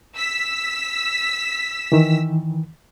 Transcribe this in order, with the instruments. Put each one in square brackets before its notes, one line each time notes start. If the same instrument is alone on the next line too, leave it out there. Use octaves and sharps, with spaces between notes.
[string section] E6 B6
[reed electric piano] D#3 E3